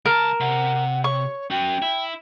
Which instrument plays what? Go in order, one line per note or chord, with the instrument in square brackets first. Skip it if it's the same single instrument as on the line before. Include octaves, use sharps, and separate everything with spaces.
[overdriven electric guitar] C#2 A5 [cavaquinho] A#4
[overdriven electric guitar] C3 [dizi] F#5
[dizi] C#5 [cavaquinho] C#6
[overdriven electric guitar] C#4 F#4 [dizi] G5
[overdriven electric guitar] E4